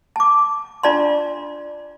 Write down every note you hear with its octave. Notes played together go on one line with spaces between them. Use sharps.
A5 D6
D4 F4 D5 A5 C6